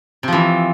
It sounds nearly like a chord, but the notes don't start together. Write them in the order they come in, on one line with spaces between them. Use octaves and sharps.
C3 F3 E3